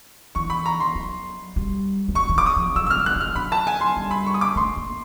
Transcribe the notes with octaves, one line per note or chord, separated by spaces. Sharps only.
E3 C#6
B5
A#5
C6
F#3
G3
G#3
G3 C#6
E3
F3 D6
D#6
F3
F#3 E6
E6
F6
G3
F#6
F#3 F6
F#3 B5
A5
G#5
C6
G3
B5
C#6
D#6
D6
A3 C6
A#3